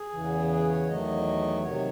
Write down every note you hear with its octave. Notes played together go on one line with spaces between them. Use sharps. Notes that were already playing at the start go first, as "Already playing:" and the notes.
Already playing: G#4
E2 C#3 E3
G#4
C#5
E2 D#3 F#3 A3 D#5
C3 D#3 F#3 C#5